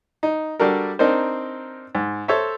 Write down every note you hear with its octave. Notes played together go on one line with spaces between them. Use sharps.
D#4
G3 D4 F#4 A4 A#4
C4 D4 D#4 A#4 C5
G#2
A4 C5 C#5 E5